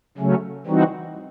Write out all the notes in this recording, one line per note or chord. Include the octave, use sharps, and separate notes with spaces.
C#3 F#3 A3 C#4
E3 G3 C4 D#4 F#4